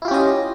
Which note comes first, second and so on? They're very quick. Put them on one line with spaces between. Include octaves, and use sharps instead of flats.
E4 F4 G4 C#4 D#5